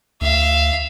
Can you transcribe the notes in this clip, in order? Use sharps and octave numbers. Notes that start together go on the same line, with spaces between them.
D2 E5 F5